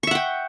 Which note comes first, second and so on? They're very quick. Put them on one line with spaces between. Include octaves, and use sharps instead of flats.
C#6 E5 F#5 G5